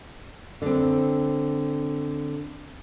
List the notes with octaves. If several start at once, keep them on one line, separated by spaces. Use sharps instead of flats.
D3 C4